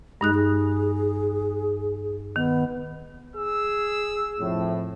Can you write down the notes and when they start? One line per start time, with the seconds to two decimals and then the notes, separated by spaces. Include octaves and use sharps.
0.21 G2 G#3 D#4 F#6
0.34 G#4
2.36 D#3 B3
3.35 G#4 E6
4.39 F2 A2